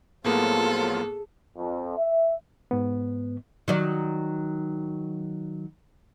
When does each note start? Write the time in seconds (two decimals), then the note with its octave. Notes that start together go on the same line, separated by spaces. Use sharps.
0.24 A2 F3 F#3 A#3 B3 F4 G#4 A4
1.57 F2
1.97 E5
2.71 G#2 B3
3.68 D#3 F#3 D5